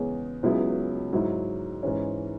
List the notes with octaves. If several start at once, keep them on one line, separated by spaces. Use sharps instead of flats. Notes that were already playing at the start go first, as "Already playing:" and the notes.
Already playing: E2 C#3 G#3 C#4 G#4
C#2 C#3 F#3 B3 E4
G#2 F#3 E4
G#2 E3 C#4